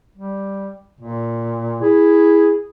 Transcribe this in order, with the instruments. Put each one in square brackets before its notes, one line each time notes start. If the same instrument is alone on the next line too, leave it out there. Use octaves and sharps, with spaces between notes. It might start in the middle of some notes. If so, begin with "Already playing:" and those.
[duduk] G3
A#2
[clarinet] E4 [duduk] G#4